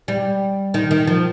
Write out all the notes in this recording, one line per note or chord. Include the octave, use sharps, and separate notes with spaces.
G3
D#3
D#3
F3